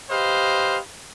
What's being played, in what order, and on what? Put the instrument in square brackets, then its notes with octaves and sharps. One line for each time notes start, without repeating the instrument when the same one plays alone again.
[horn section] G4 B4 C5 D#5 F5